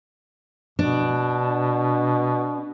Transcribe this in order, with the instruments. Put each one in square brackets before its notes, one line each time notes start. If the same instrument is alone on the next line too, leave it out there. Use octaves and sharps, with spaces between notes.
[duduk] B2 [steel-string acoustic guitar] D4